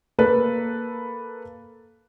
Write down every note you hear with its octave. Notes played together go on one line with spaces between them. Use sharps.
A#3 A4 B4